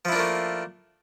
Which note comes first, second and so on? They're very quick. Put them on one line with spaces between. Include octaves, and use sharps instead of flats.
F3 E4 D4 A#3 A3